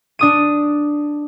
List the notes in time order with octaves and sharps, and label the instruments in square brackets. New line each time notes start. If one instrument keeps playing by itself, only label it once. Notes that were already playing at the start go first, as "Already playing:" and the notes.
[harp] D4 D#6 D#7